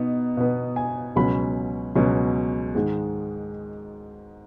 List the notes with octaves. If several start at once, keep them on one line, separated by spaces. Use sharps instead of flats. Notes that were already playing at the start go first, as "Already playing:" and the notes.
Already playing: B2 B3 D#4
B2 B3
G#5
C#2 B2 F#3 C#4 B5
C#2 B2 F#3 C#4
G#2 D#3 G#3